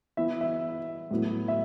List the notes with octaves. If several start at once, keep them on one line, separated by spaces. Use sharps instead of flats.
E3 B3 E4 E5
E5
A2 F#3 B3 E4
E5